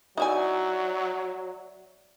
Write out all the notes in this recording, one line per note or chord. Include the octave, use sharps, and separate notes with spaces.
F#3 D#4 E4 D5 E5 G#5